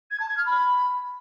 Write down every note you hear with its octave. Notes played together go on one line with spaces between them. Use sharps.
G#6
A5
G#6
F6
B5